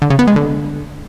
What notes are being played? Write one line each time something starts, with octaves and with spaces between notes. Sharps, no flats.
D3
C#3
B3
G#3
D3